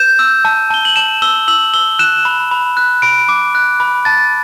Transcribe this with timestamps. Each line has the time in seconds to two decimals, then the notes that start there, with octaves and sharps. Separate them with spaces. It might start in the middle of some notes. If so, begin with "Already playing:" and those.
Already playing: G6 E7
0.19 E6
0.45 A5
0.70 A5 G7
0.85 F#7
0.96 A5 E7
1.22 E6 G7
1.48 E6 F#7
1.74 E6 G7
1.99 F#6 E7
2.25 B5
2.51 B5
2.77 F#6
3.02 B5 D7
3.29 D6
3.55 F#6
3.80 B5
4.05 A5 A6